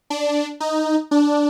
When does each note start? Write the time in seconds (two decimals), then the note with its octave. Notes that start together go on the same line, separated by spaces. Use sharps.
0.10 D4
0.60 D#4
1.11 D4